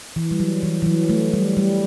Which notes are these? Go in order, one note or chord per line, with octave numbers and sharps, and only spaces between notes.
E3
G3
F#3
E3
E3
F#3
A3
G3
G3